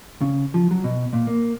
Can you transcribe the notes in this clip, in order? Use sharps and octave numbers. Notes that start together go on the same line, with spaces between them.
C#3
F3
F#3
B2
A#2
A#3